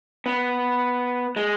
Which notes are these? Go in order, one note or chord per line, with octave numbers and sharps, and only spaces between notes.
B3
G#3